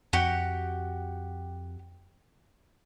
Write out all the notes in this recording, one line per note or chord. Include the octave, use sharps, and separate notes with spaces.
F2 F#4 G4 F#5